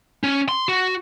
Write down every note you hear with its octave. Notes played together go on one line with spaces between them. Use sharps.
C#4
C6
F#4